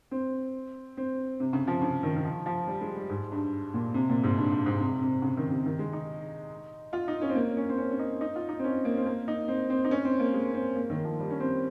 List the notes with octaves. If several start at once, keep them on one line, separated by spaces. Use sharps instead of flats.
C4
C4
C3
C#3
F3
C#3
D#3
D#3
F3
F3
G3
G#3
G3
G#2
G2
A#2
C3
A#2
G#2
G2
G2
G#2
C3
C3
C#3
D#3
C3
D#3
G#3
D#4
F4
D#4
C#4
C4
A#3
C#4
C4
C#4
C#4
D#4
D#4
F4
D#4
C4
C#4
A#3
C4
A#3
D#4
C4
C4
D#4
C#4
C4
A#3
G#3
C4
A#3
D#3
F3
G3
C#4
C4